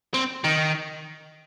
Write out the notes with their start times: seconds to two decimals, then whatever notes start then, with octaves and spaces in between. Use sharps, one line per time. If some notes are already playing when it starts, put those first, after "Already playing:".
0.14 C4
0.45 D#3